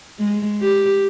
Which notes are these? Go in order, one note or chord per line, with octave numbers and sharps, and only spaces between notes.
G#3
G4